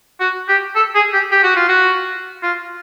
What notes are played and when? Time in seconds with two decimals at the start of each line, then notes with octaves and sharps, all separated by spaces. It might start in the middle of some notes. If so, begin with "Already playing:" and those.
0.20 F#4
0.48 G4
0.76 A4
0.95 G#4
1.13 G4
1.32 G4
1.43 F#4
1.56 F4
1.69 F#4
2.43 F4